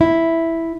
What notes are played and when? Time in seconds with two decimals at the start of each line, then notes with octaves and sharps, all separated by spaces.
0.01 E4